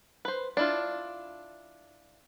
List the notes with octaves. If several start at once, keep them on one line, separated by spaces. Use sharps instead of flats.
B4 C5
D4 E4 F4